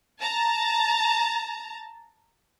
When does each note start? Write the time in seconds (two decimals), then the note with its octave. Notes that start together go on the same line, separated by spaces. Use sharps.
0.21 A5 A#5